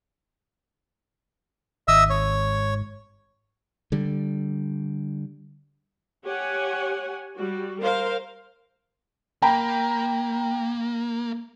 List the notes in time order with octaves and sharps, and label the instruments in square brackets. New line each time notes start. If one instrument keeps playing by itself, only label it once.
[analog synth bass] G#1 [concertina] D#5 E5 E6
[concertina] C#5
[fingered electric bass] D3 G3
[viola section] G4 C#5 F#5 G#5
G3 F#4
A#4 C5 F5
[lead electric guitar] A#3 [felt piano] G5 A#5 B5